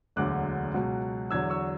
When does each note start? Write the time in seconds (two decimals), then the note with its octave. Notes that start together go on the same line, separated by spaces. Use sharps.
0.16 E1 D2 D3 F#3 D6 F#6
0.74 C#2 B2 F#3
1.31 E2 D3 F#3 E6 G#6
1.50 C#6 E6